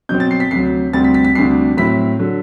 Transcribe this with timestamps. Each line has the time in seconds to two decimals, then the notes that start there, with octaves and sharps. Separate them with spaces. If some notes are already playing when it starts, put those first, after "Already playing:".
0.09 B2 F#3 C4 G6
0.20 A6
0.31 C7
0.40 B6
0.51 D2 C3 F#3 C7
0.93 D2 C3 G3 C4 A6
1.04 B6
1.14 B6
1.25 B6
1.35 D2 C3 G3 D4 C7
1.77 A2 F#3 C4 E4 B6
2.19 D3 F#3